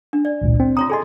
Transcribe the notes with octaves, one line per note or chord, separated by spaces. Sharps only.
D4
D5
G#1 C#2 A#2
C4
F4 C#5 A#5 D#6
G#4 A4 D#5 G#5 C6